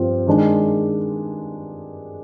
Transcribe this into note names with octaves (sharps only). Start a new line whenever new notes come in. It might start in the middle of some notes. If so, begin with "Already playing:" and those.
Already playing: G2 F3 C4 F4
D#3 G#3 D4